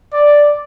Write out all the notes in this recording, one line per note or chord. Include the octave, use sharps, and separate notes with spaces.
D5